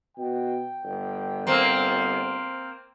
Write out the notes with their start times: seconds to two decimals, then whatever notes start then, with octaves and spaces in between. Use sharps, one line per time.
0.17 B2 G5
0.84 G1
1.47 A#3 C4